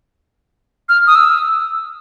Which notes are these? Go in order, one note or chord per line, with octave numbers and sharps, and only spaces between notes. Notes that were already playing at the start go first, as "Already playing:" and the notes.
F6
D#6
E6